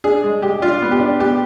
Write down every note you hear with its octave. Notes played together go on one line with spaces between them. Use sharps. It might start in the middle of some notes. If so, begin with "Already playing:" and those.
D4 G#4
G#3
G#3 G4
D4 F4
B3
G4
D4
B3 G4